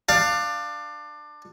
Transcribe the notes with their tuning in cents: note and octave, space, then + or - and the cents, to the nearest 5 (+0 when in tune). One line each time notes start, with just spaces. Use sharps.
D4 +20 F5 +0